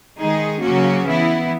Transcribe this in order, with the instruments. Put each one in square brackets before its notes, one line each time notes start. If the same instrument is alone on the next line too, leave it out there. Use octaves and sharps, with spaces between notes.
[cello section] D#3 G#3 D#4 G#4
C#3 F#3 A#3 C#4 F#4
E3 B3 E4